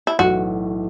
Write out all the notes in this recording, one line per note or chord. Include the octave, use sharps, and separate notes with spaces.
E4
B1 A2 E3 A3 F#4